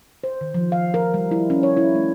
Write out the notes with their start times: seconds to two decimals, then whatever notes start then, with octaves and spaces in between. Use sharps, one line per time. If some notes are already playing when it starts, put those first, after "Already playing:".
0.24 C5
0.41 D#3
0.54 F3
0.72 F5
0.94 A#4
1.14 G3
1.31 E4
1.50 C#4
1.63 C#5
1.77 E4
1.95 A3